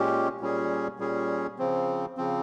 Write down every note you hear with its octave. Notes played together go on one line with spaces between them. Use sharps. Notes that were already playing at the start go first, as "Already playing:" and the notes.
Already playing: A#2 G#3 C#4 G4
A#2 G3 C#4 G#4
A#2 G3 C#4 G#4
C#3 F3 C4
C#3 F3 C4